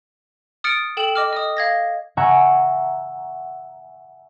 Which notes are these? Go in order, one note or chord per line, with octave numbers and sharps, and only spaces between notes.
D#6 F6 A6 C#7 D7
A4 G5 E7 F#7
D#5 D6 F6
D#5 D#6
F5 G#6 A#6
E5 F#5 G#5 A#5 C#6